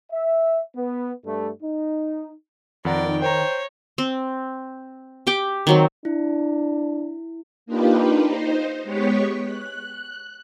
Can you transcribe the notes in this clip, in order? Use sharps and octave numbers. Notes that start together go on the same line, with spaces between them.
E5
B3
G2 G3 A3
D#4
F2 D#3 D5 F#5 G5 A#5
C5 C#5 G5 A#5
C4
G4 G5 D6
D#3 F#3 C4
D4 E4
A#3 D4 D#4 F4 G4 B4
D#4 C5
G#3 B3 G4 C#5 C#6 B6
F#6